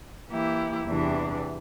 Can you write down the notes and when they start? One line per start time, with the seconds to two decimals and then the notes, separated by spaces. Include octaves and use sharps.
0.30 E3 A#3 E4 G4
0.88 E2 C3 E3 G3 D4